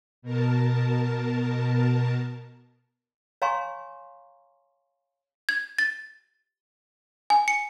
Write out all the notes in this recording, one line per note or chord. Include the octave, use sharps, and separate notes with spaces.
B2 A#4 A5
C#5 F5 G#5 A#5 C6 C#6
G#6
A6
G#5
C#7